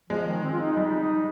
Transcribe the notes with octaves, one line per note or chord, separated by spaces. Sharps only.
F3 G#3
D#3
C4
F4
D#4
G3 D#4
D#4